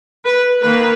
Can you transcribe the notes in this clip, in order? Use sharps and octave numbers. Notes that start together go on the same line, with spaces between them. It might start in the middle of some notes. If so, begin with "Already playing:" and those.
B4
D#3 A#3 B4